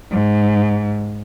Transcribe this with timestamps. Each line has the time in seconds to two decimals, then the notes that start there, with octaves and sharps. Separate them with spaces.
0.10 G#2